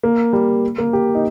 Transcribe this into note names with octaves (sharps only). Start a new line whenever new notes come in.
A#3
G3
A#3
G4
D#4